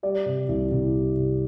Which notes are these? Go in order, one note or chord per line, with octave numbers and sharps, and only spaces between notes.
G3 D5
C3
C2
C2
G3
C3